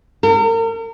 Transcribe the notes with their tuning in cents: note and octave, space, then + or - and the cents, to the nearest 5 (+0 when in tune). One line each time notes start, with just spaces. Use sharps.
A#4 -40